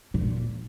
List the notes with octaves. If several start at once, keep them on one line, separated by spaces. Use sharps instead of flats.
A#2